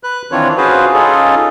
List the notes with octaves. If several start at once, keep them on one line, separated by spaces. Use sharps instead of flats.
B4 F#6
D#3 E3 C4 D4 F4 C#5
C#4 F4 F#4 G#4 B4 C5
C#4 D#4 F4 G#4 A4